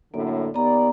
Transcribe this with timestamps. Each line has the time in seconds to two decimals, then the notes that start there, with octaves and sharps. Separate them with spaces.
0.14 F#2 A2 D3 A#3
0.54 D#2 B3 D5 A#5